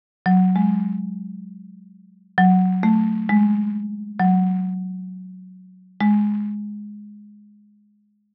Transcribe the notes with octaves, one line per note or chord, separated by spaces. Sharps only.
F#3
G#3
F#3
A3
G#3
F#3
G#3